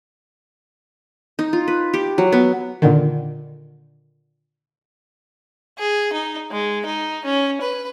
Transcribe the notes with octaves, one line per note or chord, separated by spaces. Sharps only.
D#4
F4
B4
G4
F#3
B3
A#2 D3 D#3
G#4
D#4
G#3
D#4
C#4
B4